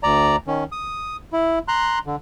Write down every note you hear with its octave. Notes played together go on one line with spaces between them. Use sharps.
D2 D5 A#5
D#3 C#4
D#6
E4
A#5 C6 F#6
D3